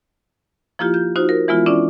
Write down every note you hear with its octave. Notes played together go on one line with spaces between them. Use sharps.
F3 A#3 E4 F4 G4
G6
D#4 F4 F#4 C5
A#4
E3 G#3 B3 E4 F4
C#4 D4 E4 D5